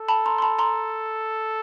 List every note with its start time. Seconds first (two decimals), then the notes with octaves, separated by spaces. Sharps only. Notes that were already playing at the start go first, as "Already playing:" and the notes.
Already playing: A4
0.09 A5 B5
0.26 A#5 C6
0.38 C6
0.42 A5 B5
0.59 A#5 C6